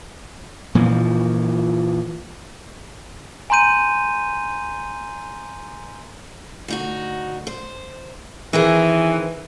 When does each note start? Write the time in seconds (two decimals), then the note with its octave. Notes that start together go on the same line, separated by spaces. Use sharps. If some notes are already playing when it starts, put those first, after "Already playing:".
0.75 A#2 E3 F3
3.50 G#5 A#5 C6 G6 D#7
6.68 D2 D#4 F#4
7.47 C5
8.53 D#3 E3 C4 G#4